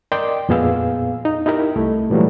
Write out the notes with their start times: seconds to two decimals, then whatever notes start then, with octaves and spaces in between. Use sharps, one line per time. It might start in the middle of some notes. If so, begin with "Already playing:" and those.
0.12 A#4 D5 D#5 G5 C6 D6
0.49 F2 A#2 B3 G#4 F5 E6
1.25 D#4
1.46 D#4 E4 G4 A#4 D#5
1.76 C2 A3 E4
2.10 A#2 E3 F#3 G3 A3